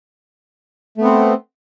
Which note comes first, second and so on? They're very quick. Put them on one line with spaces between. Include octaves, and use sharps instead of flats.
A3 B3 C4